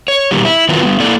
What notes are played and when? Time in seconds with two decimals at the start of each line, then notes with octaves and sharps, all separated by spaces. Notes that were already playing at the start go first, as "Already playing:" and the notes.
0.08 C#5
0.31 B2 D#3 G3
0.45 E4
0.68 D#3 E3 F#3 B3 F4
0.82 G3 B3
1.00 A#3 E4 A4 D5